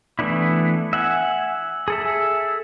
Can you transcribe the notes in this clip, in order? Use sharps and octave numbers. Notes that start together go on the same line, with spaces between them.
E3 A3 B3 D4 E4
E5 F#5 G#5
G#4 A4 E5